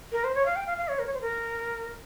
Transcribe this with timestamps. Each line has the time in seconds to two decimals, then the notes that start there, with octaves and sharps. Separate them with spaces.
0.12 A#4
0.24 C5
0.35 C#5
0.46 F5
0.56 G5
0.66 F5
0.77 F5
0.88 C#5
0.99 A#4
1.06 C#5
1.14 C5
1.21 A#4